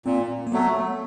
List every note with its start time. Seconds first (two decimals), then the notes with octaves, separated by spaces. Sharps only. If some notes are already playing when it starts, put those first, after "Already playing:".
0.06 A#2 C4
0.47 A#3
0.52 F#3 A3 B3